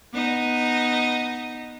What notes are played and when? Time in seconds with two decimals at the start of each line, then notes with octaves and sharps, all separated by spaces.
0.14 B3 D#4 D#5